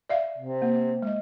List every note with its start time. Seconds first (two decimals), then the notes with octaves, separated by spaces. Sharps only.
0.09 D5 E5 F5
0.38 C3
0.62 A#3
1.02 G#3 D#5